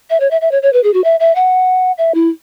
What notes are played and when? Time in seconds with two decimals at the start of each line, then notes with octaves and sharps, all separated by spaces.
0.10 E5
0.20 C#5
0.31 E5
0.41 E5
0.51 C#5
0.62 C#5
0.73 B4
0.83 G#4
0.94 F#4
1.04 E5
1.20 E5
1.35 F#5
1.98 E5
2.14 E4